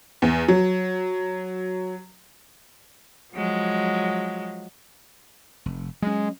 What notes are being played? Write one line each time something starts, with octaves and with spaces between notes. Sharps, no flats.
E2
F#3
F3 F#3 G#3
F1
F#3 G#3 C#4